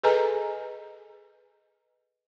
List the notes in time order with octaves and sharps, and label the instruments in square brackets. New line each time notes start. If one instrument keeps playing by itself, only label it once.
[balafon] G#4 A4 B4 D#5 G#5 A#5